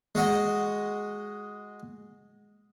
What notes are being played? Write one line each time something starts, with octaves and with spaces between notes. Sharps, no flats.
G#3 F#4 D#5